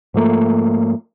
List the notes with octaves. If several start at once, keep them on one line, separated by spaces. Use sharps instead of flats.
G#2 F3 A3 A#3